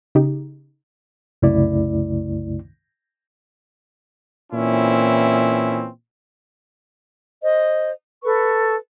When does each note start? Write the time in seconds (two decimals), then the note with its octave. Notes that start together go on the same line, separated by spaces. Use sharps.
0.15 C#3 D#4 G4
1.42 C2 F#2 C#3 A3 E4 D5
4.53 A#2 E3 C4 C#4 E4
7.43 C5 D#5
8.23 A4 B4 C#6